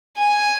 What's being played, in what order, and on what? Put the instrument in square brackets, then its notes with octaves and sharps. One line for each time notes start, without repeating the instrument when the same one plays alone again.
[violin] G#5